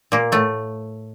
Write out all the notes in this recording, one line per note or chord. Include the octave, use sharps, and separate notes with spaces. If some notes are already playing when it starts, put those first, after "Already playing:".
A#2 A#3
A2 A3